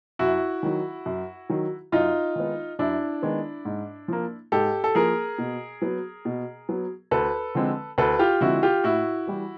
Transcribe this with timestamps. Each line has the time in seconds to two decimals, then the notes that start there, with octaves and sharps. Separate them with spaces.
0.19 F#2 E4 F#4
0.63 D#3 F#3
1.06 F#2
1.50 D#3 F#3
1.92 F#2 D#4 F4
2.36 D#3 G#3 B3
2.79 F#2 D4 E4
3.22 D#3 G#3 B3
3.65 G#2
4.08 F3 A#3
4.52 G#2 G4 A4
4.84 A4
4.95 F3 A#3 G#4 A#4
5.38 B2
5.82 F#3 B3
6.25 B2
6.69 F#3 B3
7.11 D2 A4 B4
7.55 D3 F3 G#3 C4
7.98 D2 A4 B4
8.19 F4 G4
8.41 D3 F3 G#3 C4 E4 F#4
8.63 F4 G4
8.84 A2 E4 F#4
9.27 E3 G3